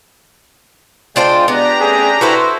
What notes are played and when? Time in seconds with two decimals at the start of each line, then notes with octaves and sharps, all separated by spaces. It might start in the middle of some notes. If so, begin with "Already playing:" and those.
1.16 G#3 D4 F4 C5 G5 A5
1.48 B3 D4 G4 D5 A#5
1.81 A3 C4 C#4 G#4
2.21 E4 F#4 A4 B4 C5